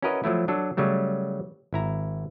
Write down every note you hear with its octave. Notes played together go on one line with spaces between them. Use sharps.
C#4 E4 F#4 A#4 B4 D#5
F3 F#3 A3 E4
F#3 D4 A4
C#3 F#3 G3 A3
G#1 E4 A#5